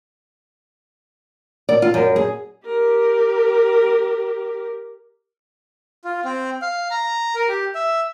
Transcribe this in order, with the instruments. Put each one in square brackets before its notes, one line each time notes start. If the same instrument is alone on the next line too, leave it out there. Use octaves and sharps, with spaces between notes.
[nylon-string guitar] D5
F4
F#2
G#4
[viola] G4 A#4
[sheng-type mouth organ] F4
C4
F5
A#5
A#4
G4
E5